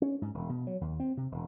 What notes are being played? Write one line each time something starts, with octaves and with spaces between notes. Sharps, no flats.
C#4
G#2
E1
B2
F#3
D#2
C4
C3
E1